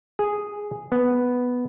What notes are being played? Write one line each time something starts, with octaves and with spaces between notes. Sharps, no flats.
G#4
B3